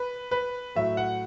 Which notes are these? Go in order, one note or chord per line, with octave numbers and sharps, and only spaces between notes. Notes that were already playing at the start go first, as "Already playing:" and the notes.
Already playing: B4
B4
A2 F#3 E5
F#5